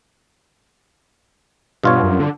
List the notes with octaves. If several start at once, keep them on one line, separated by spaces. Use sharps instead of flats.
G2 B2 F4 C#5
F#2
D3